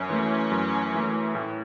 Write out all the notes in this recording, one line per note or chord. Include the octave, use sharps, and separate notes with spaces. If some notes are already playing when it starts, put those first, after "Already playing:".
Already playing: F#2 C#4
E3 A3
F#2
E3 A3
A2